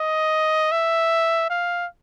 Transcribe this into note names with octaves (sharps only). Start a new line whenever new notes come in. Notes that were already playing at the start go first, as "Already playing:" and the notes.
Already playing: D#5
E5
F5